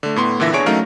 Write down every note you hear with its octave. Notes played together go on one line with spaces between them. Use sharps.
D3 A3
A2 B3 C6
A#2 D3 E3 E5 A#6
E2 D4 G#4 C#5 D7
F#3 A3 C#4 D#4 A#4 F5